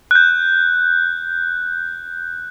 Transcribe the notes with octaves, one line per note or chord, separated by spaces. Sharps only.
F#6 G6